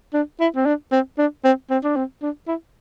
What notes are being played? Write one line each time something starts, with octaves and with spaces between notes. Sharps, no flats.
D4
E4
C4
D4
C4
D4
C4
C4
D4
C4
D4
E4